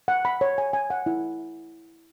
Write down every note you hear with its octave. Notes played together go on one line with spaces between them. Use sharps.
F#5
B5
C#5
G#5
G#5
F#5
E4